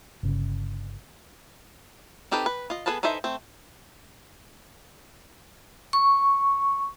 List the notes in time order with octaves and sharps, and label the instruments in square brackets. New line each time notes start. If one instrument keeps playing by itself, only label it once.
[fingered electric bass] G1 C#3
[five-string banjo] C4 D#4 G4 A4 B4
B4
F4 D#5
B3 G#4 A4 B4 A5
E3 D#4 A4 C5 E5
A3 C4
[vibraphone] C#6